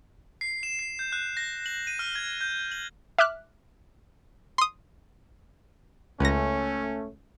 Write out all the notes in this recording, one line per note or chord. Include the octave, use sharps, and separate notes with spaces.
C7
E7
C7
G6
F#6
A#6
F#7
D#7
F6
G#6
G6
F#7
E5 D6 F6 F#6
C6 D#6
C#2 A3 C#4 A#6